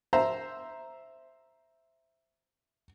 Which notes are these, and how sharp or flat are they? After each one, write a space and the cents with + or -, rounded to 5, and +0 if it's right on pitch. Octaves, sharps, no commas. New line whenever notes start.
C5 +0 E5 +0 A#5 +0